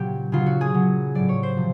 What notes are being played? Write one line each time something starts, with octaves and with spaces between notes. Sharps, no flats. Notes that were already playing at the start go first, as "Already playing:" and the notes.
Already playing: A#2 C#3 F#3 G4
C#3 F#3 F4
F#4
G#4
C#3 F#3
A2 F#3 D5
C#5
C5
C3 F3